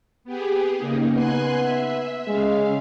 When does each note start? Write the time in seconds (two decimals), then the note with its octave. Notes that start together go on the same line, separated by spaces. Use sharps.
0.24 B3 G4 G#4
0.77 C#3 A#3 D#4
1.15 B3 G#5 C6 F#6
1.60 E5
2.27 C#3 G#3 F5